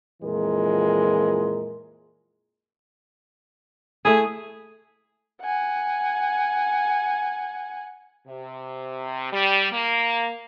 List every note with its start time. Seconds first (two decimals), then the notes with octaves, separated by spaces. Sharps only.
0.22 F2 A#2 E3 G#3 A#4
4.05 A3 E4 G#4
5.41 F#5 G#5
8.27 C3
9.33 G3
9.72 A#3